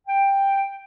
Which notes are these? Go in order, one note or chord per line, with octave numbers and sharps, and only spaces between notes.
G5